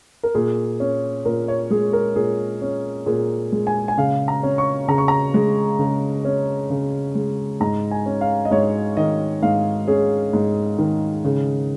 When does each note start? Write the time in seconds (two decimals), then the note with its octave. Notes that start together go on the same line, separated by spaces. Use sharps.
0.23 A#4
0.35 A#2 G#4
0.80 C#4
1.25 A#2 A#4
1.48 C#5
1.70 G#3 G#4
1.93 A#4
2.16 A#2 G#4
2.62 C#4
3.06 A#2 G#4
3.52 G#3
3.67 G#5
3.88 G#5
3.97 C#3 F5
4.28 A#5
4.43 C#4
4.58 C#6
4.88 C#3 A#5
4.98 C#6
5.08 A#5
5.34 G#3
5.79 C#3
6.25 C#4
6.70 C#3
7.15 G#3
7.60 G#2 A#5
7.91 G#5
8.06 C#4
8.21 F5
8.45 D#5
8.51 G#2 C#5
8.97 D#3 D#5
9.43 G#2 F5
9.87 C#4 G#4
10.33 G#2
10.78 D#3
11.25 C#3